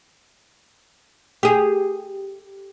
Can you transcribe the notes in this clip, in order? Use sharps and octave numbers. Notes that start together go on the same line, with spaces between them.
G4 G#4